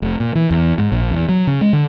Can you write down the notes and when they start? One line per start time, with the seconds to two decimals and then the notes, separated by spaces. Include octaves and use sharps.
0.02 F1
0.20 A#2
0.35 E3
0.51 E2
0.78 G#2
0.92 A#1
1.11 E2
1.29 F#3
1.47 C#3
1.61 G#3
1.73 D3